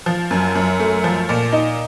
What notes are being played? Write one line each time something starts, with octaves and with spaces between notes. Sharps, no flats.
F3
F#2
F#2
A3
F3
A#2
D#4